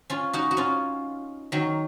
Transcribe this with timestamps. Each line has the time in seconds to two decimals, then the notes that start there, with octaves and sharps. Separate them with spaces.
0.10 C#4 F4
0.33 D#4 F#4
0.51 F#4
0.57 C#4 F4
1.52 D#3 F#3